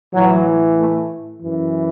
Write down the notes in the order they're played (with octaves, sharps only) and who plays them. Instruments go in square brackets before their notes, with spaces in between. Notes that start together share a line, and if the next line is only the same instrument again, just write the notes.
[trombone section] A2 E3 F#3
A3
F#2 E3